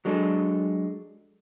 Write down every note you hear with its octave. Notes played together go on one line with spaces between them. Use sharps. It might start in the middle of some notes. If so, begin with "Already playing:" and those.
F#3 G#3 D4 A4